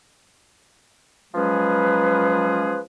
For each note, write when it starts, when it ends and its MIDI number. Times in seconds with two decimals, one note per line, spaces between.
1.34 2.79 53
1.34 2.79 54
1.34 2.79 56
1.34 2.79 61
1.34 2.79 68
1.34 2.79 71